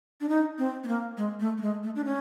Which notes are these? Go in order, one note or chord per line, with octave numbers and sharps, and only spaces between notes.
D4
D#4
C4
B3
A#3
G#3
A3
A3
G#3
A3
D4
C#4